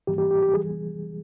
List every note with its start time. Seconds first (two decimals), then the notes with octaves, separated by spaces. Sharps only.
0.07 G#2 E3 G3 A#3 G4
0.18 G4
0.31 G4
0.42 G4
0.54 E3 G3 G#4